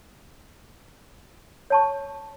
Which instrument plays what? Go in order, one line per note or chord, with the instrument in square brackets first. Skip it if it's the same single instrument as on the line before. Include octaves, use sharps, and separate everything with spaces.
[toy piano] C#5 A5 C#6